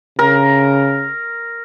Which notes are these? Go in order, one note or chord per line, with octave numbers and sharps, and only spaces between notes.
C#3 A#4